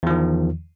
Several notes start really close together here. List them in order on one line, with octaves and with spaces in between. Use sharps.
E2 F3 D#3